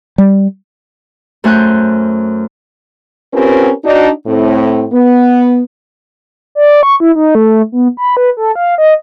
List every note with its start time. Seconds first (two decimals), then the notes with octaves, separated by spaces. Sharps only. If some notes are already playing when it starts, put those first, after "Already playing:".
0.18 G3
1.44 F#2 A3 C5 G#5 F#6 G6
3.34 C4 C#4 F4 G4 A#4 B4
3.84 D4 D#4 F#4
4.26 A2 C4
4.92 B3
6.55 D5
6.83 C#6
7.00 E4
7.15 D#4
7.35 A3
7.72 B3
7.97 B5
8.17 B4
8.37 A4
8.55 F5
8.78 D#5